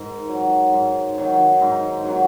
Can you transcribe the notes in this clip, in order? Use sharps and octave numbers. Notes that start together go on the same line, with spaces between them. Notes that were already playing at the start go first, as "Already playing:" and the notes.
Already playing: G#2 A#4
F#3
G#2
D#3 F#3
G#2 D#4
D#3 F#3 F#4